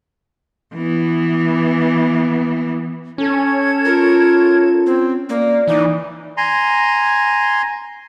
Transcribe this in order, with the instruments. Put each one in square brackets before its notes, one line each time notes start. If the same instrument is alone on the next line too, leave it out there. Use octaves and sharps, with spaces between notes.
[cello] E3 B3
[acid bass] C#4 [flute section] A4 C#5 G#6
[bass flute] F4 [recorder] A#4
[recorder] C4
[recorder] A#3 [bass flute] D5
[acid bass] E3 [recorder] D#4 [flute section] D6
[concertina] G#5 A#5 C6